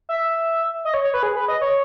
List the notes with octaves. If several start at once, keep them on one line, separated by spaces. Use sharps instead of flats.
E5
D#5
C#5
C#5
B4
G#4
B4
D#5
C#5